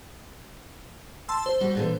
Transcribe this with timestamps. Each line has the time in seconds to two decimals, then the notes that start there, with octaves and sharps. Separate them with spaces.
1.29 A5 C6 E6
1.46 C5
1.60 G3 F#4
1.75 A#2 D3 E3